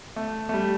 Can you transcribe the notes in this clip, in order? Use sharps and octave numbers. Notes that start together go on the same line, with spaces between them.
A3
A3
G3